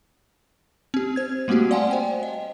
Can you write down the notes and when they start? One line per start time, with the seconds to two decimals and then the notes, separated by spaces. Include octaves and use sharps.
0.94 C4 G4
1.16 C5 G#6
1.48 G3 A3 A#3 C4 F#4 G4
1.71 D5 F5 F#5 G#5 A5 C6
1.91 C5 G5
2.23 D#5